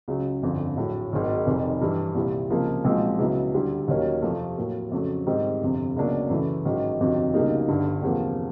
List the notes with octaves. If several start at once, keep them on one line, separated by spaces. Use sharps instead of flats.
C#2 C#3 F#3
G1 F2 D3 F3
A#1 A2 F#3
G#1 G#2 D#3 F#3
F1 F2 C3 D#3
G2 E3 G3
C2 A#2 G3 C4 E4
C#2 C3 F3 A#3
B1 A#2 F3 G#3 C4
C#2 B2 F#3 B3 E4
D2 D3 G3
D#2 D#3 F#3 A#3 C#4
F2 C3 F3 A3
A2 F#3 A#3
F2 C#3 F#3 A3
G#2 D#3 G3 C4
G1 F2 C3
C#2 B2 F#3 A#3 D4
F#2 C#3 E3 A3
A1 G#2 D#3 F#3
G1 F2 C3 D#3 F#3
C#2 B2 G3 A#3 D#4
G1 G2 D3
E2 C3 F3 A#3